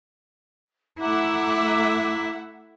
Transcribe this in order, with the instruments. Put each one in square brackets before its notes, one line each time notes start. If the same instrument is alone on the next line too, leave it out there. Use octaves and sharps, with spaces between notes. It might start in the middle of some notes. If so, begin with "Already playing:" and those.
[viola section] A3 E5 F#5 [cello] E4 [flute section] A#5 D6